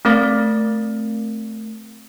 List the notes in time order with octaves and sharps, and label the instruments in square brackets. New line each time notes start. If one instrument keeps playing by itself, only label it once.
[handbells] A3 C4 A#4 F5 A6